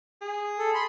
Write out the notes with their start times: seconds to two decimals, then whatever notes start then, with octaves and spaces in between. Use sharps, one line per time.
0.22 G#4
0.59 A4
0.74 B5 C6